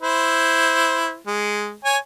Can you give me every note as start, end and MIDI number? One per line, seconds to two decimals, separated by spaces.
0.02 1.16 64
0.02 1.16 72
1.27 1.73 56
1.85 1.97 73
1.85 1.97 80